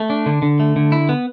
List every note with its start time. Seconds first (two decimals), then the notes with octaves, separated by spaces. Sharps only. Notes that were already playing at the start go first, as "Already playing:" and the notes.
Already playing: A3
0.10 D4
0.26 D3
0.42 D3
0.60 A3
0.76 D3
0.92 E4
1.09 B3